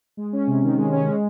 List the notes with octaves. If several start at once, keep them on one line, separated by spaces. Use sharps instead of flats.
G#3
C#4
C3
D#3
G#3
C#4
G#3